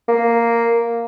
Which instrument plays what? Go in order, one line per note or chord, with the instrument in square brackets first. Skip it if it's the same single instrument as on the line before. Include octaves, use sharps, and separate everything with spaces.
[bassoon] A#3